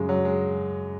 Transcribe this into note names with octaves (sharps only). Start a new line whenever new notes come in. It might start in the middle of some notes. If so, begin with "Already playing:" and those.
Already playing: F#2 C#3 G#3
F#3
G#3